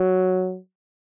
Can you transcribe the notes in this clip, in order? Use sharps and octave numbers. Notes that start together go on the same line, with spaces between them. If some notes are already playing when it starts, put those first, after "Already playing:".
Already playing: F#3